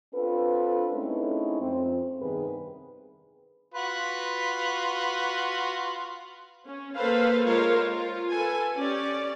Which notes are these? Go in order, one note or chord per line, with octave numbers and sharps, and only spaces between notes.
C4 D4 F4 A4 B4
G#3 A3 C4 C#4 D#4 E4
F2 C4
G2 C3 D#3 B3 G#4 B4
F4 F#4 B4
C#4
A#3 A4 B4 C5 F5
G#3 F4 A#4 C5 C#5 F5
F4
A4 B4 G#5
C#4 G4 D5